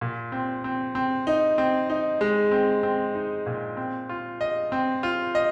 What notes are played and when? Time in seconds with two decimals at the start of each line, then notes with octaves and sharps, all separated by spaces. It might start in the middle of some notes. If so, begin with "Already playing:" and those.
0.01 A#2
0.32 C4
0.64 C4
0.95 C4
1.27 D#4
1.58 C4
1.90 D#4
2.21 G#3
2.52 C4
2.83 C4
3.15 D#4
3.46 A#2
3.77 C4
4.09 F4
4.41 D#5
4.72 C4
5.03 F4
5.35 D#5